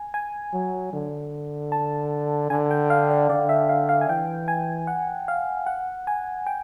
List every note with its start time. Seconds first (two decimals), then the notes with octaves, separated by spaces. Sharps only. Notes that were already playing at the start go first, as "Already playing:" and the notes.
Already playing: G#5
0.14 G#5
0.53 F#3
0.93 D3
1.72 A5
2.50 D3 G#5
2.71 G5
2.90 F5
3.10 D5
3.29 D3 D5
3.49 E5
3.69 F5
3.89 F5
4.01 G#5
4.09 E3 G5
4.48 G#5
4.87 F#5
5.28 F5
5.67 F#5
6.07 G#5
6.47 G5